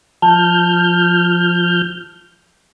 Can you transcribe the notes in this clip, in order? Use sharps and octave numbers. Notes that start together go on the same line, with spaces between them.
F3 A5 F6 G6